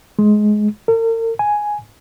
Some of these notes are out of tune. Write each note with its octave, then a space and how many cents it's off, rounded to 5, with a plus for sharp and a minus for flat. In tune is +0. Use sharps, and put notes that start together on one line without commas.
G#3 +15
A#4 -45
G#5 +5